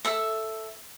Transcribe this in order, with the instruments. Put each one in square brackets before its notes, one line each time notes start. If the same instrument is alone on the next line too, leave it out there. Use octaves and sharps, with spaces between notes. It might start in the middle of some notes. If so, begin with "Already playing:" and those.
[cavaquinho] A4 E5